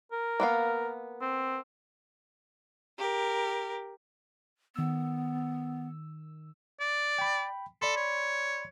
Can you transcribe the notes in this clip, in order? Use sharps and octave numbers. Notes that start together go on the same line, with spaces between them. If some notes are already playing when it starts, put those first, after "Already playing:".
A#4
A#3 B3 F5
C4
G4 A#4
D#3 B3 E6
D5
G5 B5
A4 D5 B5 C6
C#5